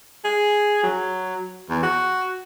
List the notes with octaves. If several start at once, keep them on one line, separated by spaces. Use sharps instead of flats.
G#4
F#3
E2
F#4